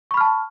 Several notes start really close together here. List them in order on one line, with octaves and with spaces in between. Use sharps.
C#6 B5 F6 A5